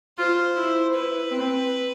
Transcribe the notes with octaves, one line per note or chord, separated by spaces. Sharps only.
F4 C5
E4
E4 B4
C4